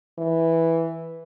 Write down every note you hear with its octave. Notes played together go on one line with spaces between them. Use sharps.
E3